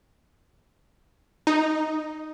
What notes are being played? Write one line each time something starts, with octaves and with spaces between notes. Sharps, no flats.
D#4